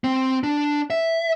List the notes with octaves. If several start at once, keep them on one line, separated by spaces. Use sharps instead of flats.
C4
D4
E5